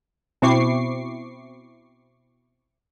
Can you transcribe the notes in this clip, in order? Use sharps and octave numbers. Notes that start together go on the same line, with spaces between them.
B2 C4 E4 C#6 D6 C7